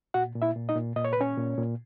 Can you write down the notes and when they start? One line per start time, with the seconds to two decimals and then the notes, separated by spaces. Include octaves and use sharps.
0.14 A#2 F#4 F#5
0.36 A#2
0.42 E4 E5
0.56 A#2
0.69 D#4 D#5
0.76 A#2
0.96 A#2 D#5
1.05 C#5
1.13 B4
1.17 A#2 C#4 C#5
1.37 A#2
1.58 A#2